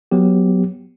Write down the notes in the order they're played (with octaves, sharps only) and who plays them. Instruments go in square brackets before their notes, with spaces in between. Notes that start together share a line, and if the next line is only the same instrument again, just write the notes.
[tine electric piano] F#3 B3 G4